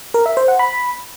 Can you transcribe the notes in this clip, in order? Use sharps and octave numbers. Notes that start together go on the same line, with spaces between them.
A#4
E5
C5
F#5
B5